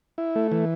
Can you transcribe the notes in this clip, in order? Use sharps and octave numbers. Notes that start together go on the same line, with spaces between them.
E4
A3
E3